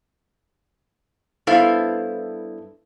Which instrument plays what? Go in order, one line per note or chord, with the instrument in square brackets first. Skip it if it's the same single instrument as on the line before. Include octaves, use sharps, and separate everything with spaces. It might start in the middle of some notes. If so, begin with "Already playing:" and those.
[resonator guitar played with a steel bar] G2 B3 E4 A4 C5 F5